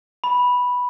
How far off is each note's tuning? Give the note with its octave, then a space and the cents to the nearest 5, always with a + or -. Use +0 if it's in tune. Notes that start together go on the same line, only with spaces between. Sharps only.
B5 -5